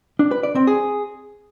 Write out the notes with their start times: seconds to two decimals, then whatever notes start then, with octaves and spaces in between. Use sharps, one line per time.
0.19 D4
0.31 B4
0.43 D5
0.55 C4
0.67 G#4